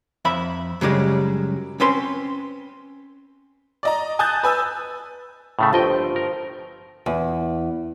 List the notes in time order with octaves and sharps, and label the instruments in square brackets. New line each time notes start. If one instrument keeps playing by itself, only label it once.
[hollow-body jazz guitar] F2 E5 B5
F#2 C#3 G3 G#3
C4 C#4 B4 C6
[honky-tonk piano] D5 D#5 A#5
G#5 A5 D#6 F#6 G6 A6
B4 G#5 E6
[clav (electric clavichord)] A2 C#3 A3
[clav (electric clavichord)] G1 D#5 G5 [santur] F3
[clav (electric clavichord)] A#4
[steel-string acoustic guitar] E2